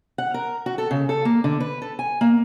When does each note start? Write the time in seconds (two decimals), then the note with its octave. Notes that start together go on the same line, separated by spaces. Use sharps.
0.18 F#5
0.34 A#4
0.66 F#4
0.78 A4
0.91 C#3
1.09 A4
1.25 A#3
1.44 D3
1.60 B4
1.82 A4
1.99 G#5
2.21 A#3